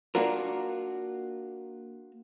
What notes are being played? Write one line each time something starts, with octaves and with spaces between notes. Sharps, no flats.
A#3 D4 F4 F#4 A#4